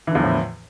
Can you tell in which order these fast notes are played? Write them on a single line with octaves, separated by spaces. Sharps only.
E3 D3 E2 F3 A2